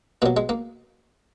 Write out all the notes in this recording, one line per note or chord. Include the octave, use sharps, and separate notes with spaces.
B2 F#3 A#3
G#3
A#3